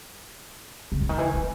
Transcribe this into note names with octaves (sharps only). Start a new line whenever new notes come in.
C#3
D3
D#3
E3
F3